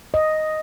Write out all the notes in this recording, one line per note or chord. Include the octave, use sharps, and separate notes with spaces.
D#5